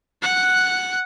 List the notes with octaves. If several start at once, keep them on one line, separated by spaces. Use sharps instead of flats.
F#5 F#6